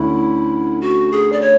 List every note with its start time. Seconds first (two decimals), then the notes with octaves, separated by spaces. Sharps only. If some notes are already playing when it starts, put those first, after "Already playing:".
Already playing: D2 D3 C#4 E4
0.81 F#4
1.12 G#4
1.32 D5
1.41 C#5